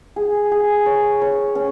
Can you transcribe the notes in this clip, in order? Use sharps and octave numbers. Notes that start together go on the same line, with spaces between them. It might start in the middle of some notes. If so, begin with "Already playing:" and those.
G#4
G#4
C#5
C#5
C#4